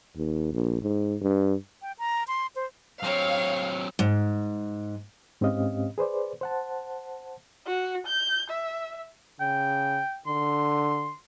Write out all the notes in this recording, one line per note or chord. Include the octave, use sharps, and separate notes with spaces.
D#2
A#1
G#2
G2
G5
A#5
C6
C5
F#3 C4 C#5 F5
G#2
G#2 C4 C#4 G4 D#5 F5
G#4 B4 C5 D5
C5 F#5 A5
F#4
G6
E5
C#3 G5
D3 C6